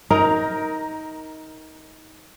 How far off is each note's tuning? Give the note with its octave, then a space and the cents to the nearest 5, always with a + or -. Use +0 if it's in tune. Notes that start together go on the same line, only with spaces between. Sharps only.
D#4 +20 A#4 +5